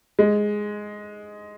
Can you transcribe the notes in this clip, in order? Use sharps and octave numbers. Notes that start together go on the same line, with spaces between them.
G#3